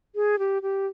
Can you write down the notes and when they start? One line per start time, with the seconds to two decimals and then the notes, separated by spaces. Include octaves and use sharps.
0.15 G#4
0.39 G4
0.62 G4